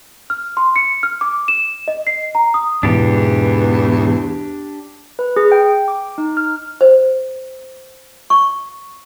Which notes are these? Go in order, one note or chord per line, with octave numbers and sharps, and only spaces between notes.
F6
C6
C#7
F6
D6
E7
D#5
C7
A#5
D#6
E2 G#2 B2 E3 D4 G4 B4
B4
G#4
G5
D6
D#4
F6
C5
C#6